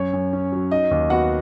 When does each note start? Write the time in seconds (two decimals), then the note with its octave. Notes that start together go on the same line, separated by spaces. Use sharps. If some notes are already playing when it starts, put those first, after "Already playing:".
Already playing: F#2 C#5
0.13 F#2
0.33 C#4
0.52 F#3
0.71 D#4 D#5
0.91 D#2
1.10 B3 F#4 F#5